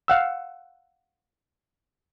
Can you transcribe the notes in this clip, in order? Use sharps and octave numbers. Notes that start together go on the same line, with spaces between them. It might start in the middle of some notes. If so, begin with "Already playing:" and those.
F5 F#5 E6